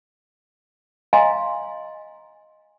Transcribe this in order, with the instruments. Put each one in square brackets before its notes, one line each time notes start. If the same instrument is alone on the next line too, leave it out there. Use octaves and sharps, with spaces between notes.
[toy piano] D#5 F5 G#5 A#5 C6